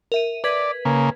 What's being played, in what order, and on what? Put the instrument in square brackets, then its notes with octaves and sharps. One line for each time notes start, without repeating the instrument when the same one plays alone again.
[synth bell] A#4 E5 D#7
[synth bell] B4 G#6 B6 [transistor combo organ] D5
[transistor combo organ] C#3 A#3